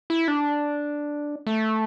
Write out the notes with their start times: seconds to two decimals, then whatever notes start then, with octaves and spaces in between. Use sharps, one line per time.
0.10 E4
0.28 D4
1.47 A3